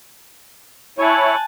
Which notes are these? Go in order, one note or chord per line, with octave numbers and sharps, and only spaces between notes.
E4 C#5 G#5 A5 F#6